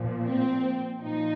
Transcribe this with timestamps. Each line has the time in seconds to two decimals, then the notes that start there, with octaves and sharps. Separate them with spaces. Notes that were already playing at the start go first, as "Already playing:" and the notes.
Already playing: A#2 F3
0.25 C4
1.01 A#2 F3 D#4